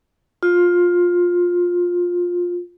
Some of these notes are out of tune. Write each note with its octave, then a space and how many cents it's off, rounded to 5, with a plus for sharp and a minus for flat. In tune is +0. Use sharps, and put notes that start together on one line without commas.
F4 +15